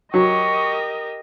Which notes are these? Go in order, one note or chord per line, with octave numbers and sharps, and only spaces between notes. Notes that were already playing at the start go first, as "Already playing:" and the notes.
F#3 G4 A#4 D#5 C#6